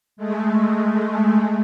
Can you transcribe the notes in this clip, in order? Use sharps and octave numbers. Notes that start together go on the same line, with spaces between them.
G#3 A3